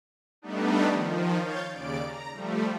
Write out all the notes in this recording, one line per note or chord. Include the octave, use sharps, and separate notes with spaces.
G3 A3 B3 D4 D#4
D#3 F3
C#5 F5 G6 A6
D#2 C#3 D5 D7
A#5
F3 G3 A3